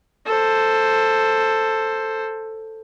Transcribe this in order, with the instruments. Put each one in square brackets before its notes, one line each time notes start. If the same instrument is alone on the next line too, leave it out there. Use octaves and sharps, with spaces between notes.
[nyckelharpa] A4 C5